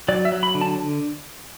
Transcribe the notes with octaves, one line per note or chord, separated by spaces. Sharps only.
F#3 D5
E5
F#3
B5
D3
A5